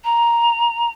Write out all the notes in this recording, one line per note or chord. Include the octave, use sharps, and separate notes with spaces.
A#5